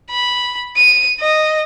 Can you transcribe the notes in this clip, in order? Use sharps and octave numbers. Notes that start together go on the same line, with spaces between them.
B5
D#7
D#5